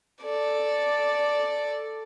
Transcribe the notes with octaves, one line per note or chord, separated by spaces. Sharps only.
A4 D5